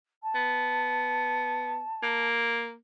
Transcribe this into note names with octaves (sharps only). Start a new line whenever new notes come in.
A5
B3
A#3